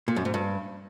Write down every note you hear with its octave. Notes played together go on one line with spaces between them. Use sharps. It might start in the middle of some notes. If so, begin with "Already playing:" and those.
A#2
F#2
G#2
G2